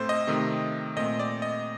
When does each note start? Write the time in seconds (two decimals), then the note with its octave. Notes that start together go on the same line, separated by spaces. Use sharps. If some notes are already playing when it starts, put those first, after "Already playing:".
Already playing: A2 A3 C4 A4 C5
0.09 D#5
0.27 C3 D#3 A3 C4
0.97 A#2 A3 C4 D#5
1.19 D5
1.42 D#5